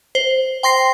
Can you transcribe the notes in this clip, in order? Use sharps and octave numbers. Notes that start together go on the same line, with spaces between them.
C5
G5 C6 A#6 C7